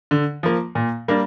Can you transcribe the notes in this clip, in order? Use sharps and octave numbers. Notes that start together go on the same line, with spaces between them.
D3
F3 A#3
A#2
G3 A#3 D4